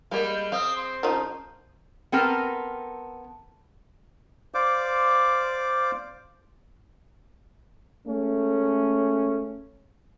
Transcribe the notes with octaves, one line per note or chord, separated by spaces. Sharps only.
G3 G#3 A#3 F5 B5
C4 F5 D#6
C6
C#3 F3 D#4
B3 C4 A4 A#4 G5
C5 D5 F5 D6
G#3 A3 C#4